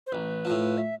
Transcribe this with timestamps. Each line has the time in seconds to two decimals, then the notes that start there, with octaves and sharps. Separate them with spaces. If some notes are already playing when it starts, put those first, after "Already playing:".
0.07 C5
0.12 A1 B4
0.45 A2 F3
0.78 E5